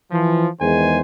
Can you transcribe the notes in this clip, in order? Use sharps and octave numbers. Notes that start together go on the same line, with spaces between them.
E3 F3
E2 D#3 G#3 C5 G#5